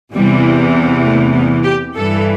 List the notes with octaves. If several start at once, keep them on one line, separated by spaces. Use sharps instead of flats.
E2 C3 E3 G3
A3
B3
G4
G2 E3 A4